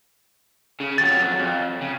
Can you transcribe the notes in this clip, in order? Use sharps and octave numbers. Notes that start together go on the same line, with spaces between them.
C#3
F2 F#3 A6
F2
C#3